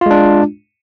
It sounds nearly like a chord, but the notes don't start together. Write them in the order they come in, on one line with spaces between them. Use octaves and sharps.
F4 G#3 D4